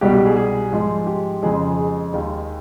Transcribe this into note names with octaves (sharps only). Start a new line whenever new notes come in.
C2 B2 G3 G4
G4
G#4
G#4
G#2 F3 G#3
G4
F2 C#3 F3 G#3 G#4
G#4
D#2 D#3 G#3